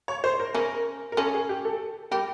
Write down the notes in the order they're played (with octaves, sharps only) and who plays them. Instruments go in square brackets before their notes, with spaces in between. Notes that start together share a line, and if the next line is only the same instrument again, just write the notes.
[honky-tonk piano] C#5
C5
A#4
[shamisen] C#3 C#4 [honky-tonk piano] A#4
[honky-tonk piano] A#4
[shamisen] C#3 C#4 [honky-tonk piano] A4
[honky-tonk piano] G#4
G4
A4
[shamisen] G3 G4 [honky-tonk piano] A#4